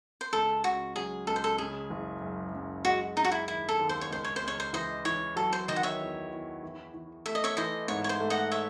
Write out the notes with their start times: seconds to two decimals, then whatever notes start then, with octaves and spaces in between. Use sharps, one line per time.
0.21 C5
0.33 C#2 A4
0.64 C#3 F#4
0.96 F#3 G#4
1.27 C#2 A4
1.36 C5
1.44 A4
1.58 C#3 G#4
1.90 F#1
2.22 F#2
2.53 F#2
2.85 G#3 F#4
3.16 G#3 D#4
3.24 F#4
3.31 E4
3.48 D#2 E4
3.69 A4
3.79 D#2
3.89 C5
4.01 C#5
4.10 C#2 C5
4.24 C#5
4.36 C5
4.42 C#2
4.48 C#5
4.60 C5
4.73 E3 C5 D#5
5.05 E3 C#5
5.36 F#3 A4
5.53 C5
5.68 D#3 C5 D#5
5.76 F#5
5.83 C#5 E5
5.99 E2
6.31 E2
6.63 E3
6.94 E3
7.26 A3 E5
7.35 D#5
7.44 C#5 E5
7.57 E3 C5 D#5
7.88 G#2 C#5
8.04 C#5
8.09 C5
8.20 A3
8.30 D#5 F#5
8.51 C#5 E5